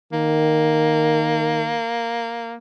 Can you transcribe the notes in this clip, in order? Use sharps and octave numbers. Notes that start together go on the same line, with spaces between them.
D#3 A#3